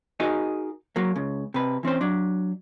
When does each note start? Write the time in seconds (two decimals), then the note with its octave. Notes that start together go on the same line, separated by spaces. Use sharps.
0.20 D#4 F#4 G#4 A#4 D#5
0.96 F#3 A#3
1.16 C#2 C#3
1.54 C3 B4
1.83 E3 C4 C#4 C5
2.01 F#3 D4